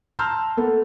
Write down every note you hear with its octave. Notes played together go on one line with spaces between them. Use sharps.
A5 A#5 C6 E6 F6 G6
A3 B3 A4